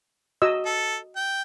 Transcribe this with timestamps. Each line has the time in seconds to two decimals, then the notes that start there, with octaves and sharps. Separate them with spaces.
0.42 F#4 D#5 E6
0.66 A4
1.16 G5